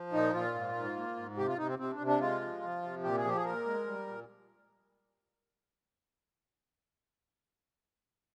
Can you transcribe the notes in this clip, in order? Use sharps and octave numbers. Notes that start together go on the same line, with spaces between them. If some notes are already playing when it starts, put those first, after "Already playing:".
Already playing: F3
A#2 D#4
A#2 F4
G#2
G#2
A#3
G#2
C3 G4
F4
C3 D#4
C4
C3 C4
D4
C3
D4
G#3 F4
F3
F3
C3
A#2 G4
G#4
F3 G4
G#4
A#2 A#4
G#3
G3
A#2